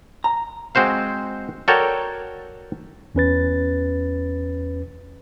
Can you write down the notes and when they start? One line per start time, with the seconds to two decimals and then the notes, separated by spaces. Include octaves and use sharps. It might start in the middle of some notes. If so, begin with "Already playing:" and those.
0.24 A#5
0.75 G#3 C4 F#4 C5 F5
1.68 F#4 A4 A#4 C#5 D5 G5
3.15 E2 C#4 B4 A6